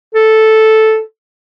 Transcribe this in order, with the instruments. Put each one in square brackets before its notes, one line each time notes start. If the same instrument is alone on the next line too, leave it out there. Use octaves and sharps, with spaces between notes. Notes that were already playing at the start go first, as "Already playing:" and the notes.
[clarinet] A4